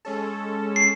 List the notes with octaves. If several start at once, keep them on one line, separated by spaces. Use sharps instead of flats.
G#3 C#4 A4
C7